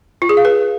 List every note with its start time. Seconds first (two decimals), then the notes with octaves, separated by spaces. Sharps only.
0.22 F4
0.29 G#4
0.37 F5
0.45 B4